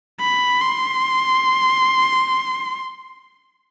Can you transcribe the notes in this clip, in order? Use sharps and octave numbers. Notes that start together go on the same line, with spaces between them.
B5
C6